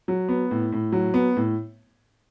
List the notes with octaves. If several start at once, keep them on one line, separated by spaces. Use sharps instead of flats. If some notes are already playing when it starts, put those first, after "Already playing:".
F#3
B3
A2
A2
F#3
B3
A2